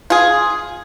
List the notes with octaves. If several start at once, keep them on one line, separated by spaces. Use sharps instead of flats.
F4 G#4